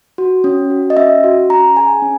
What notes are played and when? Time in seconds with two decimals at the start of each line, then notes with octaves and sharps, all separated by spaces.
0.18 F#4
0.44 C#4
0.70 F#4
0.90 D#5
0.97 C#4 E5
1.24 F#4
1.50 C#4 A#5
1.77 G#4 G#5
2.02 C#4